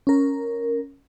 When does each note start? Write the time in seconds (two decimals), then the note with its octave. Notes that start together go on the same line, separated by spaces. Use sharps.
0.07 C#4 A#4